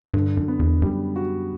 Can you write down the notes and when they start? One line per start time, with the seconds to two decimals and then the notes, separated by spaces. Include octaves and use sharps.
0.14 G2 D3
0.37 F#2
0.48 B3
0.59 E2
0.82 F#2 G3
1.16 F#4